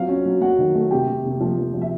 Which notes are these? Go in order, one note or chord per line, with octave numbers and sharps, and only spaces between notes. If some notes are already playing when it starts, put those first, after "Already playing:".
Already playing: F#3 C4 F4 F5
C#4
F#3
F#3 F#4 F#5
D#3
A3
C3 G4 G5
C3
C3
F3
F3
F3
E5